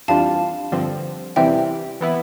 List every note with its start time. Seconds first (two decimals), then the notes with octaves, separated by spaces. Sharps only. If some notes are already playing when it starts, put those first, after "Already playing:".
0.08 F2 E3 G3 D4 F4 F5 A5
0.72 G2 D3 F3 C4
1.36 E2 C3 E3 G3 C4 E5 G5
2.01 E3 B3 E4